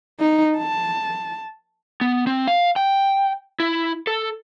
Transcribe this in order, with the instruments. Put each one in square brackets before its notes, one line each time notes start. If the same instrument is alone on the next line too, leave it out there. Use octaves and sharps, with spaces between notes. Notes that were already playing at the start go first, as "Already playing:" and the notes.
[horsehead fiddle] D#4
A5
[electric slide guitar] B3
C4
F5
G5
E4
A4